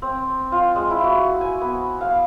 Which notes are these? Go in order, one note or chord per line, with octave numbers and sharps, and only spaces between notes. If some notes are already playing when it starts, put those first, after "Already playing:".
C4
F4
G#3
E4
F#4
G#5
B3
F5